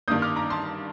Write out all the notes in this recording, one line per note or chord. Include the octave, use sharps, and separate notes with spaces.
G2 D#3 A#3 D#6 G6
D6 F6
A#5 D6
A5 C6